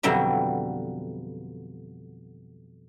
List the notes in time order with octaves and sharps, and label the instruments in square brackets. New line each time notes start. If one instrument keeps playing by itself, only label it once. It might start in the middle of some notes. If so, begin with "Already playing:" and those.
[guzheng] F2 B2 D3 F#3 G3 E5